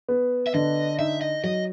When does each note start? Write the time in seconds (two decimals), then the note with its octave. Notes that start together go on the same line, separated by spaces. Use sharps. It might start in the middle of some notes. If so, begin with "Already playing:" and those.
0.09 B3
0.47 E5
0.54 D3 D#5
0.99 D#4 E5
1.21 D#5
1.44 F#3 D#5